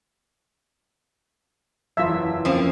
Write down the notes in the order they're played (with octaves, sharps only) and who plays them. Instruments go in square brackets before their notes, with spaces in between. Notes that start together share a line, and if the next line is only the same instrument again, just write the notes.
[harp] F#1 E2 [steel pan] F4 E5 [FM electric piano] F5 A5 E6
[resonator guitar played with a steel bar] F3 A#3 [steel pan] C4 [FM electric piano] C#4 [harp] D7